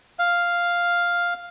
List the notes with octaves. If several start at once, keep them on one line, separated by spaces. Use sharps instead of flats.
F5